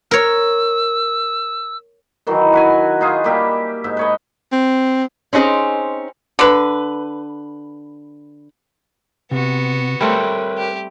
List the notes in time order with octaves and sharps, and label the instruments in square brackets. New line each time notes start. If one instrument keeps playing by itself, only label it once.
[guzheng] A#4 C#5 [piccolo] E6
[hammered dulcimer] D#3 E3 F#3
F#4 B4 G#5
D#4 F4 G#4
G3 A#3 G4 E5
G#2 E5
B4 C#5 D#5
[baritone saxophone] C4
[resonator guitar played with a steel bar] C4 C#4 D#4 G#4 C5
[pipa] D3 B4
[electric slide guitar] C3 [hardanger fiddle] B3 F#4
[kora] G3 A3 C4 [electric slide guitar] A#4 B4 C#5
[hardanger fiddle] G4